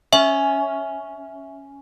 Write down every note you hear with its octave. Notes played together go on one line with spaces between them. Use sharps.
C#4 E5